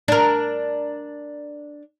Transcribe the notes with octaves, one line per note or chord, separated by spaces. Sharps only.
D4 A#4